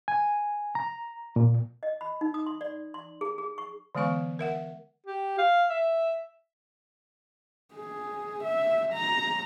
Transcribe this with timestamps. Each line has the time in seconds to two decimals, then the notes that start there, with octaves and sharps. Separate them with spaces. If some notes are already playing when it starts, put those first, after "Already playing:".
0.08 G#5
0.75 A#5
1.36 A#2
1.83 D#5
2.01 B5
2.21 D#4
2.34 D#6
2.46 C6
2.61 D5
2.94 C6
3.21 G#4
3.38 G#4
3.58 C#6
3.95 D3 E3 G#3 B3 F5 C#6
4.39 A#4 E5 F#5
5.06 G4
5.38 F5
5.70 E5
7.75 G#4
8.44 E5
8.93 A#5